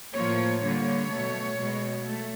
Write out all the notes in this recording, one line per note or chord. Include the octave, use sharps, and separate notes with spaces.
A2 F3 A#3 C#5
D3 G3 A#3 C#5
B2 F#3 A3
B2 G#3
A3